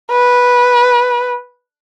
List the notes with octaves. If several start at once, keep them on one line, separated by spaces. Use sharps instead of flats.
B4